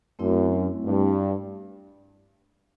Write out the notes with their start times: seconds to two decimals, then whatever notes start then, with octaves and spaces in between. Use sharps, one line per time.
0.19 F#2 A3 C4 E4
0.85 G2